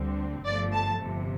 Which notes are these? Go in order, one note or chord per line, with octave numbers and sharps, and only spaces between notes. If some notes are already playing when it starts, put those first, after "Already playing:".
Already playing: D2 D3 G3 C4
G1 G2 F3 A3 D5
A5
G1 F2 C3